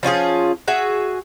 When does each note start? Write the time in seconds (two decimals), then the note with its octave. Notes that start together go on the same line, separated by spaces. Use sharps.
0.03 F3 C#4 F4 G#4
0.68 F#4 G#4 E5